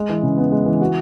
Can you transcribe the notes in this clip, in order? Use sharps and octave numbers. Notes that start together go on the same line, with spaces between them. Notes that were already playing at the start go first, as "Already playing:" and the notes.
Already playing: G#3
E3
C#3
B3
G#3
E3
F#4